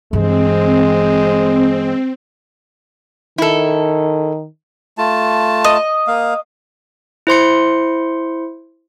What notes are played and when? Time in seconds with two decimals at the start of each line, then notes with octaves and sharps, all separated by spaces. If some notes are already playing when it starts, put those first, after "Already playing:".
0.13 G2 E3 G#3 C4
3.38 D#3 E4 A4
4.98 A3 F4 A5
5.64 D#5
6.07 A#3 F5
7.27 E4 C5 C6 C#7